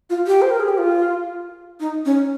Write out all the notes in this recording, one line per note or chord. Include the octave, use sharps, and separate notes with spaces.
F4
G4
C5
A#4
G#4
G4
F4
D#4
C#4